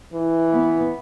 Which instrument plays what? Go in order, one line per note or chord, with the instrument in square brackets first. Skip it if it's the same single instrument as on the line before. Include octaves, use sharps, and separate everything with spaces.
[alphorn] E3
[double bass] B3